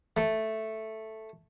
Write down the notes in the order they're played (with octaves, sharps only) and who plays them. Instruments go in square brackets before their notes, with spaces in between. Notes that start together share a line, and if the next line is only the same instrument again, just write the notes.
[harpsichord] A3